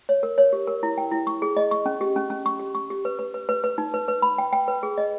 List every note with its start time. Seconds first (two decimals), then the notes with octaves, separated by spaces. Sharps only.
0.09 C#5
0.23 A#4
0.38 C#5
0.53 G4
0.68 A#4
0.83 E4
0.98 G5
1.11 E4
1.27 C#6
1.42 G#4
1.57 D#5
1.71 C#6
1.86 C#4
2.01 G4
2.16 C#4
2.30 C#4
2.46 C#6
2.60 G4
2.75 C#6
2.90 G4
3.05 B4
3.19 B4
3.34 B4
3.49 B4
3.64 B4
3.78 D#4
3.94 B4
4.08 B4
4.22 B5
4.38 G5
4.53 G5
4.68 B4
4.83 G#4
4.98 D#5